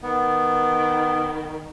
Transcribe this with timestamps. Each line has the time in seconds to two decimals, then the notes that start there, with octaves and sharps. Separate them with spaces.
0.03 D#3 B3